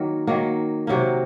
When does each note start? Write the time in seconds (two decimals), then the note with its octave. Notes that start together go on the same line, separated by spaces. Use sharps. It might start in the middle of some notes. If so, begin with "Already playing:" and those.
Already playing: D#3 F#3 A#3 A#4
0.27 D#3 F#3 A#3
0.87 C3 F#3 A#3